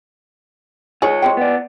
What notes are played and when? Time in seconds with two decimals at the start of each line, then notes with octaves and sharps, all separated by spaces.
1.02 D#3 F4 G#4 C#5
1.22 G#3 C4 G5
1.37 B3 D5